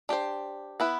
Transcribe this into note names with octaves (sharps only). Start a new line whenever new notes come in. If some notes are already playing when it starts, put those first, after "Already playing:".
D4 G4 C5
B3 E4 B4